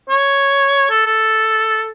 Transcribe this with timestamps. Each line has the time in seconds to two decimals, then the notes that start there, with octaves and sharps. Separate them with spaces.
0.09 C#5
0.90 A4
1.06 A4